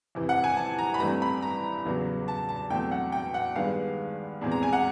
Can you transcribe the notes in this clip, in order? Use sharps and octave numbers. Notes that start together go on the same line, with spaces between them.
F2 C3 E3
F#5
G#5
A5
A#5
B5
G2 E3 A3 C4 A#5
B5
A#5
E2 C#3 F#3 B3
A5
A5
E2 B2 F#3 A3 C4 G5
F#5
G5
F#5
G2 D#3 G#3 B3 F5
E2 B2 G#3 C4
A#5
G#5
F#5